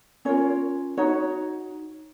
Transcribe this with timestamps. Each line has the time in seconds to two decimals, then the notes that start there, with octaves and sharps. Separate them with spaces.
0.25 C#4 F4 A#4 C#5
0.97 D#4 F#4 C#5